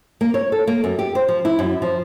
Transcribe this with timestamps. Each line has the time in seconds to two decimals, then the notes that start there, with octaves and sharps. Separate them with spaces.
0.21 A#3
0.34 C#5
0.52 A4
0.67 A#3
0.84 F#2
0.99 G4
1.15 C5
1.28 F3
1.45 E4
1.59 F#2
1.82 F3